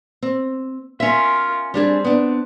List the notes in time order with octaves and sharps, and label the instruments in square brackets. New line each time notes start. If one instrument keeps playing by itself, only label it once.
[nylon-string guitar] C4
[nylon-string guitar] C#4 E5 [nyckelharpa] F4 A#4
[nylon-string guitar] G3 D4 G#4 [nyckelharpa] C4
[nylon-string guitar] B3 D4